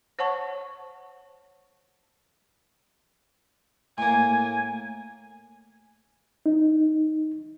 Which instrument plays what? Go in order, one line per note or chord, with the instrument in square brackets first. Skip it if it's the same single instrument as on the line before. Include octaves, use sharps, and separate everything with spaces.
[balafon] C5 C#5 F#5 A5 C#6
[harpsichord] A2 A#3 [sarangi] G#5
[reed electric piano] D#4